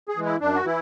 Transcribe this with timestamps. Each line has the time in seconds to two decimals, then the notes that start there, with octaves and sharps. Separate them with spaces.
0.09 G#4
0.16 E3 G#3
0.25 E4
0.41 F#2 D4
0.55 F#4
0.65 E3 E4